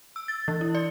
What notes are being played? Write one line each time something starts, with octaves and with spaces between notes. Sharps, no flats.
E6
A6
E3
E4
D5